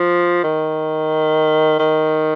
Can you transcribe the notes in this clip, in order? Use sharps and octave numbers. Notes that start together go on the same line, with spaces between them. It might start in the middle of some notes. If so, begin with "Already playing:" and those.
Already playing: F3
D#3
D#3